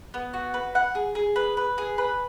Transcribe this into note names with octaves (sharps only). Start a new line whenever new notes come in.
B3
F#4
B4
F#5
G#4
G#4
B4
B4
G#4
B4